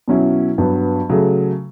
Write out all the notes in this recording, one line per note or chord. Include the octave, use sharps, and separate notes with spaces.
B2 F#3 C#4 E4
G2 F#3 B3
C#3 F#3 A3